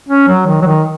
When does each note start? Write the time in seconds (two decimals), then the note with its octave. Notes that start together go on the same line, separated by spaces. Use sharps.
0.09 C#4
0.28 F#3
0.47 D#3
0.62 F#3
0.66 D#3